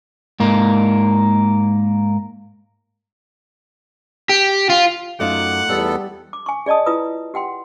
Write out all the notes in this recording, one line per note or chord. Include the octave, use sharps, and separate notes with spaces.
G#2 A#3
G4
F4
F#2 A3 D#4 F4 E5 F#5 D6
E2 G3 B3 A4
D6
G#5 C#6
G#4 D5 D#5 A5 D#6
E4 F4 B4 D#6
G4 F#5 G5 C6